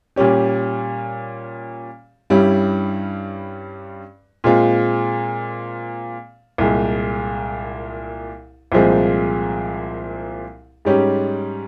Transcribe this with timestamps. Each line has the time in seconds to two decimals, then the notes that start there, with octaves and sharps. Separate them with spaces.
0.16 A#2 G3 C#4 G4
2.30 G2 G3 C#4 E4
4.44 A#2 G#3 C4 F4
6.58 C2 A#2 G#3
8.72 C2 A#2 F3 G#3 C4
10.85 G#2 G3 C#4 G4